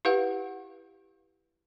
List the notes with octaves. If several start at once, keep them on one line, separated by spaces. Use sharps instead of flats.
E4 G4 B4 F5 F#5